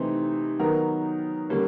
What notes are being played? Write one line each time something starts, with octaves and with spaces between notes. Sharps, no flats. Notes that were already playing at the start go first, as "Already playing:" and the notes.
Already playing: C3 E3 A3 C4 D#4
D#3 F#3 B3 D#4 A#4
D3 G3 A#3 C#4